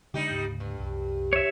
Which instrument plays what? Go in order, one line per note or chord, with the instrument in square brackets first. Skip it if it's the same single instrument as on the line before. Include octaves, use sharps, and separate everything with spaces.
[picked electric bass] D3 G#3 D4 [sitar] G3 D#4 G4
[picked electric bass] D2 G#2 C#3
[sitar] G2
[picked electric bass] C2 F#2
[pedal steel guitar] C#5 E5